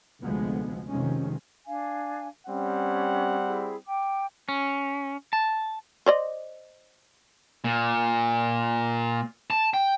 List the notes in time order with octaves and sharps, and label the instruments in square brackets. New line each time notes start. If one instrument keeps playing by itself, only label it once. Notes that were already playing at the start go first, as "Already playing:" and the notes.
[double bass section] F1 D2 D3 F3 G#3 B3
F1 C3 D#3 F3 G#3 C#4
[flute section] D4 F5 G#5
[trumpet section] G3 C4 F#5 [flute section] C#4
[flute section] E4 G#4
G5 D6
[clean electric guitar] C#4
A5
[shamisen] C5 D5 D#5
[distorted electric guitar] A#2
A5
G5